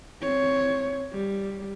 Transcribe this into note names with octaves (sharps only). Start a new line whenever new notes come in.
C4 C#5
G3